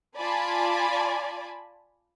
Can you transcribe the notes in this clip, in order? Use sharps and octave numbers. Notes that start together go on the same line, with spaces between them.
F4 D5 G#5 A5 B5